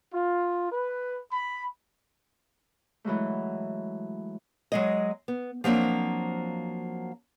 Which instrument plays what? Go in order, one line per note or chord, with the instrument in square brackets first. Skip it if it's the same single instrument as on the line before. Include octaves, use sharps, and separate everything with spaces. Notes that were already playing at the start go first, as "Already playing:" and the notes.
[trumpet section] F4
B4
B5
[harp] E3 F#3 G#3 A3
[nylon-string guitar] F#3 G#3 D#5
B3
F3 F#3 A#3 C4 D4